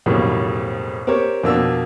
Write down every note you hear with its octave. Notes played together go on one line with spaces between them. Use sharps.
B1 F2 A2 C#3 G3 A#3
C4 G4 A#4 C#5
F2 B2 A#3 D4 E6